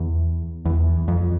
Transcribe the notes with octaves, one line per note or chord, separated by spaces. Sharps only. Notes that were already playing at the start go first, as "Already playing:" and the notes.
Already playing: E2
E2
F2